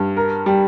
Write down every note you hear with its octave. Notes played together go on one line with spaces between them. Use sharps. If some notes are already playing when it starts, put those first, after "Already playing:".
Already playing: G2
A#4
G3